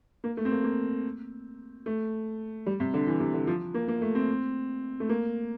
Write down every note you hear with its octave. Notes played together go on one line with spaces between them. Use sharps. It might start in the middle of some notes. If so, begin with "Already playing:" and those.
A#3
A3
C4
A#3
A#3
A3
G3
C3
D3
E3
C3
D3
F3
A#3
A#3
A3
C4
A3
A#3